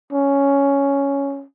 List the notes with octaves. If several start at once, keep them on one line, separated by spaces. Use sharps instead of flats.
C#4